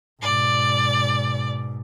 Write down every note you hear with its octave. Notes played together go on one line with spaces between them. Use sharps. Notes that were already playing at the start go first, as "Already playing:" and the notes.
G#2 B2 D5